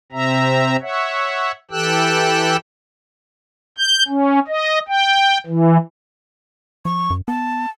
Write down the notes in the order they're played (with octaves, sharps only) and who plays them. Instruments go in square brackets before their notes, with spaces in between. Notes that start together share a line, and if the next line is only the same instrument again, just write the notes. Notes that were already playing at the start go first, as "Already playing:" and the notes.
[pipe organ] C3 C4 E5 A#5
C#5 E5 F#5
E3 G4 A4 G5 E6 F#6
G6
C#4
D#5
G5
E3
[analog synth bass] F3 [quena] C#6
[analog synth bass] F#2
[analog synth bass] B3 [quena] A5